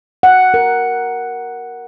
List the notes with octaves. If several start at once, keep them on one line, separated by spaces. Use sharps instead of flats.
F#5
A#4